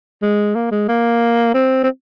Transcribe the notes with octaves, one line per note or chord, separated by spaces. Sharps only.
G#3
A#3
G#3
A#3
C4
C4